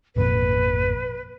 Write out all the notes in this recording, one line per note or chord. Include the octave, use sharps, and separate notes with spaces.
G#1 F2 A#2 B4